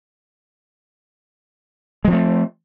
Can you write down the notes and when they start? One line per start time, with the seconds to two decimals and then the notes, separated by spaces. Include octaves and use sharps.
2.05 G#3
2.07 F3
2.10 C4
2.13 A3